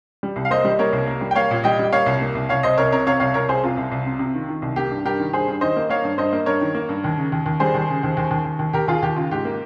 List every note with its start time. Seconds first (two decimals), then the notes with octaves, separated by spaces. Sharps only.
0.23 G3
0.36 C2
0.45 F5
0.50 A#3 C5 D#5
0.65 G3
0.79 A#3 A#4 C#5
0.93 C2
1.08 A#3
1.21 G3
1.31 G5
1.36 A#3 C#5 F5
1.51 A#2
1.64 G3 D#5 G5
1.79 G3
1.92 A#3 C#5 F5
2.06 C2
2.21 A#3
2.35 C2
2.49 C2 C#5 F5
2.63 C2 C5 D#5
2.78 C2 A#4 C#5
2.92 C3 A#4 C#5
3.06 C3 C#5 F5
3.20 C2 C#5 F5
3.34 C2 A#4 C#5
3.49 C2 G#4 C5
3.63 C3 F4
3.77 C2
3.92 C2
4.06 C3
4.19 C3
4.35 D#3
4.49 D#3
4.62 C2
4.76 A#3 G4
4.91 G2
5.05 G2 G4 A#4
5.20 D#3
5.33 G2 G#4 C5
5.48 G2
5.61 D#3 C5 D#5
5.76 A#3
5.90 A#3 C#5 F5
6.04 G2
6.18 G2 C5 D#5
6.33 A#3
6.46 G2 A#4 C#5
6.61 D#3
6.75 A#3
6.89 G2
7.04 D#2
7.17 C#3
7.32 D#2
7.46 D#2
7.60 G3 G#4 C5
7.74 D#2
7.89 C#3
8.03 D#2
8.17 D#2
8.31 D#2
8.45 D#2
8.59 D#2
8.73 D#2 G4 A#4
8.88 D#2 F4 G#4
9.02 D#2 G4
9.16 C#3 F4
9.31 G#2 G4
9.45 A#3